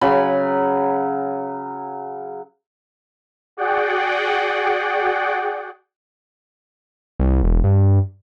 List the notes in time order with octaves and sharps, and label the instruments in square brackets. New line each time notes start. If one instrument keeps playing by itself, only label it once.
[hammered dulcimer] C#3 F#3 G#5 B5
[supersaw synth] F#4 G#4 D5 F#5 G5
[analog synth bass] C2
E1
G2